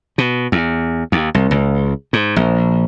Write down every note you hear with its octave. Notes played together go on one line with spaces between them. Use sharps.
B2
E2
D#2
C2
C#2
G#2
A#1